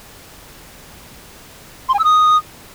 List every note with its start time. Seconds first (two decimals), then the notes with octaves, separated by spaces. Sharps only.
1.89 C6
1.94 G#5
1.99 E6
2.04 D#6